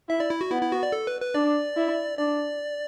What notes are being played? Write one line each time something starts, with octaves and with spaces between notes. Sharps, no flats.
E4 E5
D5
E4
F#4
B3 E4
E4
F#4
D5
A4
B4
B4
D4 D5
E4
D4 D5